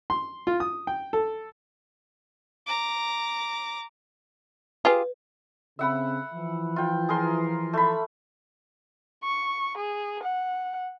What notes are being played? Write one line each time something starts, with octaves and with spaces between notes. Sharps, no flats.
C6
F4
D#6
G5
A4
A#5 D6
F4 G4 G#4 B4
C#3 C4 E5 F#5 B5
E3 F3
F4 G5
G#4 A#4 C6
A3 B5
C#6
G#4
F#5